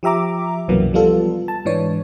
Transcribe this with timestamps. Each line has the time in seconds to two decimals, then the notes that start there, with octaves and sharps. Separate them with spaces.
0.03 F3 G4 E5 A#5 D6
0.68 C2 F#2 B2 E3 F#3 A#3
0.93 F3 G3 B3 F4 A4
1.48 A5
1.65 G#2 E3 D4 C#5